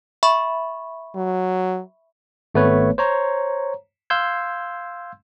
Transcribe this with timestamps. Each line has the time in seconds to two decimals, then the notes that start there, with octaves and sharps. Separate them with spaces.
0.23 E5 B5 C#6
1.16 F#3
2.55 G#1 A3 B3 B4 C#5
2.98 C5 C#5 A#5
4.10 F5 C6 E6 G6 G#6